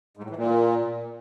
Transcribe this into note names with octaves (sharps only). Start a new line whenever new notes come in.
G#2
A2
E3
A#2